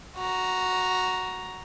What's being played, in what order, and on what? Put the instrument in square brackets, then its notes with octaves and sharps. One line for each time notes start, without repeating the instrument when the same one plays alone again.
[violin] F#4 A#5